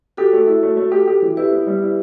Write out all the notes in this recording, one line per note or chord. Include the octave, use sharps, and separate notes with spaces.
F#4 G4 A4
A3
E4
A3
A3
G4
G4
E3
E4 G4 B4
B3
G3
E4